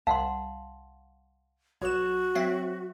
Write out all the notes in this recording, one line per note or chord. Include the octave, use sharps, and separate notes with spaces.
C2 F5 F#5 A5 C6
B1 F#4 C#5 E7
F#3 C4 E5